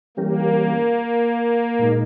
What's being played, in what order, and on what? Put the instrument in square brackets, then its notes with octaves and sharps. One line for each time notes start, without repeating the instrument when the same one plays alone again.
[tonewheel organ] E3 G3 C#4 G4 A#4 [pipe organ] A#3
[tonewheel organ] A#2 G#3 D#4 A#4